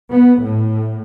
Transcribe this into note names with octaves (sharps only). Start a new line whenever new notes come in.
B3
A2